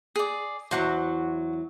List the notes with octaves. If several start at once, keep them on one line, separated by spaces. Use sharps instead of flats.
G#4 D5
E2 F#3 C5 F#5 C#6